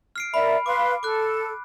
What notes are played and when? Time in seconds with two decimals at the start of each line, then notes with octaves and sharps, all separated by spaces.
0.16 F6 C7 D7
0.34 A#4 D5 E5 B5
0.66 B4 F5 C6 D6
1.03 A4 D6 F#6